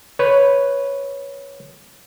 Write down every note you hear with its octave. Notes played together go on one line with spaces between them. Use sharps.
B4 C#5